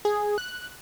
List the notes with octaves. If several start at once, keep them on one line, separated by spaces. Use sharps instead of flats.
G#4
F#6